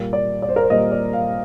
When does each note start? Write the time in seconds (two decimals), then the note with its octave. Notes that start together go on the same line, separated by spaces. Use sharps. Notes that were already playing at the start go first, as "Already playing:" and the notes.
Already playing: A#2 G3 A#3
0.13 D5
0.42 D5
0.49 C5
0.56 A#4
0.63 C5
0.70 A#2 G3 A#3 D#5
0.92 D5
1.13 F5